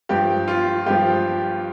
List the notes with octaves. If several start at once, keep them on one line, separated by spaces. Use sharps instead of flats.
G2 F3 G4
F4
G2 F3 G4